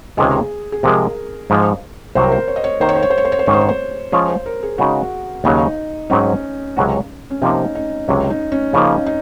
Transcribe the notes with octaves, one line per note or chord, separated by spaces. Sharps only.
C#2 C3 D#3 G#3 G#4
G#4
C3 F3 G#3 A#4
G#2 F3 G#3
C2 C3 F#3 C5
A#4
C5
C#5
D#5
C#5
D#3 A#3 D#4 A#4 C5
C#5
C5
C#5
C5
C#5
C5
C#5
C5
G#2 D#3 G#3 C#4 C#5
C5
C#5
C5
F3 G#3 C#4 F4 G#4 C#5
C5
A#4
G#4
C#3 G#3 D#4 F#4
D#2 C#3 F#3 D#4
G#2 F#3 C4 C#4 D#4
C#2 C3 F#3 C#4 F#4
C#4
C3 F3 A#3 D#4
D#4
C#2 C3 F#3 C#4
D#4
C#4
C#3 F3 A#3 D#4
D#4